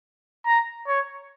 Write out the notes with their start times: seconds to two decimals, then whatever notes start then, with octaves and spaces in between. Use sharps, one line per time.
0.47 A#5
0.88 C#5